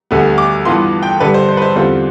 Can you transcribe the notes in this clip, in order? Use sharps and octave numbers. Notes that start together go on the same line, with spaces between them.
D2 D3 G3 B3
D6
G2 E3 B3 F4 C6
G5
G2 D3 G3 D4 B4
C5
C5
B4
C5
E2 D3 G3 C4 F4 C5